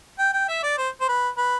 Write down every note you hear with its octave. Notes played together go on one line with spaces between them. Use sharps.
G5
G5
E5
D5
C5
C5
B4
B4